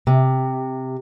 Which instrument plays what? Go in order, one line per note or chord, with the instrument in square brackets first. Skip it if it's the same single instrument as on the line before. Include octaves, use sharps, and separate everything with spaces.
[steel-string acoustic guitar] C3